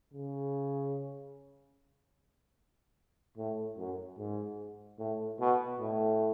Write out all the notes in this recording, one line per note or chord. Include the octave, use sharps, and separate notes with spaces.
C#3
A2
F#2
G#2
A2
B2
A2